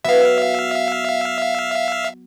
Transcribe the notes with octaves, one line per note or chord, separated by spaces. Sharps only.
F#3 B3 E4 E5 F5